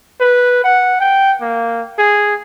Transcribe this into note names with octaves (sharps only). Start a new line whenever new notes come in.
B4
F#5
G5
A#3
G#4